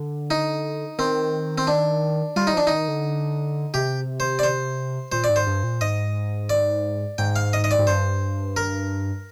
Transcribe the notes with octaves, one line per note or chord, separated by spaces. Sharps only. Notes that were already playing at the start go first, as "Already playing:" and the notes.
Already playing: D3
D#4
D#3 C4
C4
D4
G3 F4
D#4
F3 D4
D#3 D#4
D3
C3 G4
C5
D5
C5
A#2 C5
D5
G#2
C5
G2
A#2
G#2 D#5
D5
G#2 G5
F5
D#5
D#5
D5
G#2
G2 C5
A#4